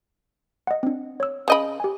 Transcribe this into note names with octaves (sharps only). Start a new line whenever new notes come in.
D#5 F#5
C4 D4
C#5 E6
C#3 D#5 B5 D#6 G6 D7
G4 G#5